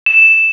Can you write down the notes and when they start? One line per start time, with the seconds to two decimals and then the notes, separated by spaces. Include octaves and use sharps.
0.06 E7